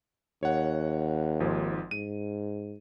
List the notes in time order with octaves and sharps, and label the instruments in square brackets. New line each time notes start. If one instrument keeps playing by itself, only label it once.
[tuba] D#2 [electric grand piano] C#5 F#5
[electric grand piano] G#1 G#2 F3
[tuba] G#2 [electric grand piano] D#7